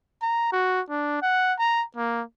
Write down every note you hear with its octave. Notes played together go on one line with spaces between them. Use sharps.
A#5
F#4
D4
F#5
A#5
A#3